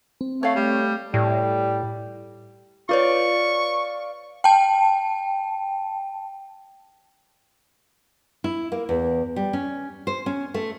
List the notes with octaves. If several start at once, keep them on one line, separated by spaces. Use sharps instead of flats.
C4
A3 C#5 F5
G3 A3
A2 G3
F4 B4 C#5 D5 F5 C#6
G5 A5
E4
A#3
E2
G3
C#4
C5
C#4
A3